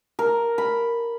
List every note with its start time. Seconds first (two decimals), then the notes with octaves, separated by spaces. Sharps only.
0.19 A#4
0.58 B5